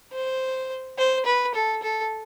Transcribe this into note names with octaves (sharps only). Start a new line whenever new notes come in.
C5
C5
B4
A4
A4